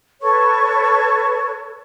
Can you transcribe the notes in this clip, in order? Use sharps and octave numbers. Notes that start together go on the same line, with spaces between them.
A4 B4 C#5 C#6